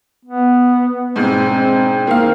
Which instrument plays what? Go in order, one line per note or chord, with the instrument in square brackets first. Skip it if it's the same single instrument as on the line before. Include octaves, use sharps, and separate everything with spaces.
[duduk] B3
[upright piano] E1 G#2 [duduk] C4
[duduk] C4
[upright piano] D#3 A#3 F5